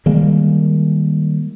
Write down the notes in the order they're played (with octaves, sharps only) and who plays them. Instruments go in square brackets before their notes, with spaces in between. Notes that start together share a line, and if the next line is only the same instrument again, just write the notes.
[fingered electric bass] D#3 G3 G#3 A#3